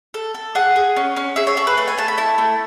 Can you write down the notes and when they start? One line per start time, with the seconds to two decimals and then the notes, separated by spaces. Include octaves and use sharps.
0.14 A4
0.34 A4
0.55 G#4 F#5
0.76 G#4
0.96 C#4
1.17 C#4
1.36 G#4 E5
1.47 C#5
1.57 G#4 A4
1.67 B4
1.77 A3 B4
1.88 G#5
1.98 A3 A5
2.08 B5
2.18 E4 A5
2.38 A3